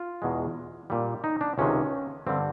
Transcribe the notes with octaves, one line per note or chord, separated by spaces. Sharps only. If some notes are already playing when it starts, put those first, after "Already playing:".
Already playing: F4
E2 B2 G#3
A#2 G3
D#4
D4
C#2 C3 D#3 G#3 C#4
G2 D3 G3 C4